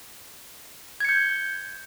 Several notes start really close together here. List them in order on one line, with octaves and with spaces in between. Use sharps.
G#6 C#7 G6